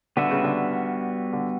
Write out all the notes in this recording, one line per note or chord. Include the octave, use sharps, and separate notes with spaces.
D3 G3 B3 F#4 B4 E5
C#3
D3
D3